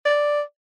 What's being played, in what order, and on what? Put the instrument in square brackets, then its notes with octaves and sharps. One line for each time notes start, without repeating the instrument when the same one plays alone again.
[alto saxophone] D5